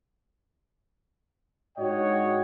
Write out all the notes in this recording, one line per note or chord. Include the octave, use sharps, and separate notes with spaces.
G#2 D4 F#4 C#5 D#5 G5